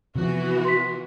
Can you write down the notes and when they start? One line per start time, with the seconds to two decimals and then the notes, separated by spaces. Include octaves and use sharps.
0.15 C3 E3 F3 B3 F#4
0.65 C6 B6